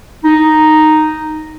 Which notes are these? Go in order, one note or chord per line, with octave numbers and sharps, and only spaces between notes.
D#4